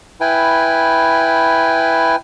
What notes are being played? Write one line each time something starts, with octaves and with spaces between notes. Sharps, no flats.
E4 B4 G5 G#5